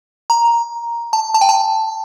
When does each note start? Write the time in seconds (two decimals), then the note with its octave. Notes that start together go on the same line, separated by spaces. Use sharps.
0.30 A#5
1.13 A5
1.34 A5
1.41 G5
1.49 A5